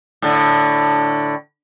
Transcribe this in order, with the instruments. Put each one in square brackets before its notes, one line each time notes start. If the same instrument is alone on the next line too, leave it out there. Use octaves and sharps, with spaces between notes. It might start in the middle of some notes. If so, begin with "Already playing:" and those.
[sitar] A2 D3